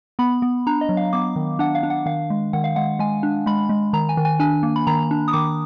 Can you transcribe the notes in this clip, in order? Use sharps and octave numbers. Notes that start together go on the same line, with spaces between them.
B3 B5
B3
D4 A#5
D#5
F#3
F5
B3 D6
D#3
D4 F#5
F5
D4
F#5
D#3 F5
G#3
D#3 F#5
F5
G#3 F#5
G#3 G#5
D4
G#3 B5
G#3
D#3 A#5
G#5
D#3
G#5
D4 G#5
A#3
B5
D#3 A#5
D4
D#6
D#3 D6